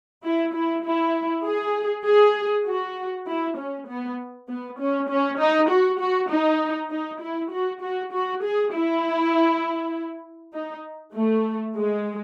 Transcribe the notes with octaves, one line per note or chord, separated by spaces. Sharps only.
E4
E4
E4
G#4
G#4
F#4
E4
C#4
B3
B3
C#4
C#4
D#4
F#4
F#4
D#4
D#4
E4
F#4
F#4
F#4
G#4
E4
D#4
A3
G#3